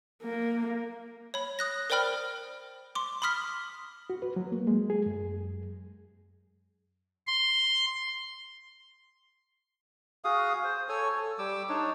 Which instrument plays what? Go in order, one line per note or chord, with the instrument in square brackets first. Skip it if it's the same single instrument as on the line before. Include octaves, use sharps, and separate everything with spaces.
[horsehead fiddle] A#3
[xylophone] C#5 B5
D#6 F#6 A#6
A#4 C5 D5 G5 B5 F6
C6 D6
B5 C6 D#6 F6 B6
[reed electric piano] F#4
B4
F#3
A#3
G#3
G#4
F#2
[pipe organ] C6
[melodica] F#4 G#4 F5 D#6
C5
A4 C#5 G#5
A4
G3 D6 E6
D4 D#4 C#5